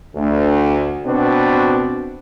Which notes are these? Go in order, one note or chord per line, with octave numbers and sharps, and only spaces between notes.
D2
B2 C4 D4 F#4 B4